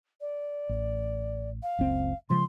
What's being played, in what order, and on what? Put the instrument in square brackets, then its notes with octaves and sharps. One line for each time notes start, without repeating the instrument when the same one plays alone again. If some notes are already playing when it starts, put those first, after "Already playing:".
[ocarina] D5
[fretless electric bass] A1
[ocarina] F5
[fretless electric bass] F#1 C#2 C4
[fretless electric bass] C#3 F3 G#3 [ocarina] C6